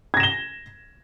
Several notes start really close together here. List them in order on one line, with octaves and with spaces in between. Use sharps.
G#6 A#6 E7 G7